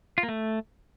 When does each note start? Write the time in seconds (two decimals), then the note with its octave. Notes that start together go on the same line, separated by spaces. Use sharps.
0.18 F4
0.23 A#3
0.29 A3